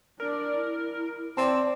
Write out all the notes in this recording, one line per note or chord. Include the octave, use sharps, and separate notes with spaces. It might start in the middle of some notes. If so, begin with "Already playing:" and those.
D4 A#4 D5
E4
C4 D5 A5